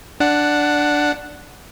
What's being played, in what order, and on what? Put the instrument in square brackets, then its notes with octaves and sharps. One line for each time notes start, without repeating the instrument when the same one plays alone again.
[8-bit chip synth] D4 F#5